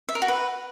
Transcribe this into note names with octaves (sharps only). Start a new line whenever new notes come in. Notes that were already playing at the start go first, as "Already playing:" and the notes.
E5
A#4
F#4
B4